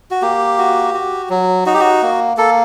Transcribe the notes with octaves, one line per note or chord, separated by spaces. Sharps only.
F#4
A#3 G4
F#4
F#4
F#3
D#4 F#4
G4
F#4
A#3
A#3 A4